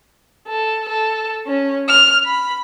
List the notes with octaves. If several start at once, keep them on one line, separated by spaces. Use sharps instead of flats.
A4
A4
C#4
F6
B5